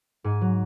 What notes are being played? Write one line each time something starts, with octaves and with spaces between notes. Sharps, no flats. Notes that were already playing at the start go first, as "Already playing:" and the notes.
G#2 G#5
F#3